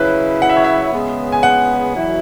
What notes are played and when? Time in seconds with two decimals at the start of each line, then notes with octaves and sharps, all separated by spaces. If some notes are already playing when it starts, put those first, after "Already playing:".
Already playing: C#3 F#3 E4 B4
0.42 F#5
0.49 E5
0.57 C#5
0.64 E5
0.93 C#3 G#3 B3
1.32 G#5
1.43 F#5
1.94 E2 B2 F#3 E4